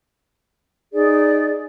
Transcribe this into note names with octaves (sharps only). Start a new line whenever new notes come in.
D#4 G#4 D5